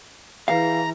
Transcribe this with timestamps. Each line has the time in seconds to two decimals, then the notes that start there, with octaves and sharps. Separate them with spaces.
0.48 E3 G#4 B4 F5 A#5